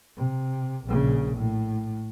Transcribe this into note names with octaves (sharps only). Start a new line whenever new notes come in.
C3
A#1 C#3
A2